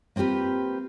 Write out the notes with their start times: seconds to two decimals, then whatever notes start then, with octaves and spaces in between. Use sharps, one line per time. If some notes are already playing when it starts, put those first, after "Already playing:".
0.16 A#3 C4 F4 G4 B4